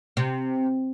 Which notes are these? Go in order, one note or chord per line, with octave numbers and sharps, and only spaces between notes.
C3